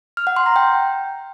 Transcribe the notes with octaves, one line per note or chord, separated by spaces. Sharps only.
F6
F#5
C6
A#5
G5